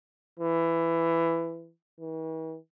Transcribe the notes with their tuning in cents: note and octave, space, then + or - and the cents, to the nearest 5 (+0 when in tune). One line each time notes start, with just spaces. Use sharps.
E3 +15
E3 -45